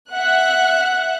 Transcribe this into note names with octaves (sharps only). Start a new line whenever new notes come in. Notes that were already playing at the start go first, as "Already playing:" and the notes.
E5 F#5 F#6